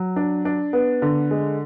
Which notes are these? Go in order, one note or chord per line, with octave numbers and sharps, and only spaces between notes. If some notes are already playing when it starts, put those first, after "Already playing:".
Already playing: F#3
D4
D4
B3
D3
G#3